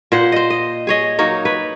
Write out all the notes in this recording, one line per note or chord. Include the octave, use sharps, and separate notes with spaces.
A#2 C5 F#5
C5 D#5
D#5
G#4 C#5 D#5
F#3 A#3 D#4 C#5
B4 C#5